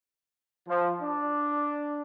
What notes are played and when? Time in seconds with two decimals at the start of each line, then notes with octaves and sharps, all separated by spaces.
0.67 F3
1.01 D4